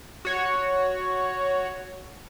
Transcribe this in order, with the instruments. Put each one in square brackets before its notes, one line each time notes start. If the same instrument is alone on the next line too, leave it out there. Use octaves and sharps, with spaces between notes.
[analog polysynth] F#4 C#5